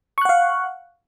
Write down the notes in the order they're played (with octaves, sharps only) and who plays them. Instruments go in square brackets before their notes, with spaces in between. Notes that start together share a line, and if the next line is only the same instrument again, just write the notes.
[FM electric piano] C#6
F#6
F#5
F5